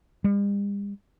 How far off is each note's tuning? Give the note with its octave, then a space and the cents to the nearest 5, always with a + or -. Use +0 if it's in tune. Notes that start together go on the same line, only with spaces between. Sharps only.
G3 +45